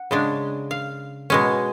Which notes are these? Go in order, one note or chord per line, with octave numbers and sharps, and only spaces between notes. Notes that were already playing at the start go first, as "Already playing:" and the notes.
Already playing: F#5
C#3 G#3 D4
F5
B2 G#3 C#4